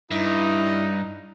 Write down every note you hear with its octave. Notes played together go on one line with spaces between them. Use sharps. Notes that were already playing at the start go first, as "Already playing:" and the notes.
G2 D#4 E4